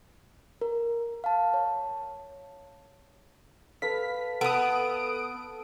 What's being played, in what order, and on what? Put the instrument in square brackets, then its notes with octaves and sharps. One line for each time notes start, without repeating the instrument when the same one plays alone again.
[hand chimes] A#4
F5 A5
C#5
[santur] A4 B4 F5 [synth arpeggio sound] B6
[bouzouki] B3 B4 [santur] A4 [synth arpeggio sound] D#6 D7